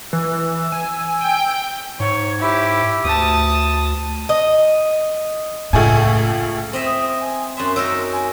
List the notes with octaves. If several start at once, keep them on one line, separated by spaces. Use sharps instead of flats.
E3 E6
G#5
G5
G#2 C#5
E4 G4
D2 A5 D#6
D#5
C#2 A2 A3 G#5
C4 D#5 E5
D#6
G#5
F#2 E5 C6
F#3 D#4 A#4 E6
G#5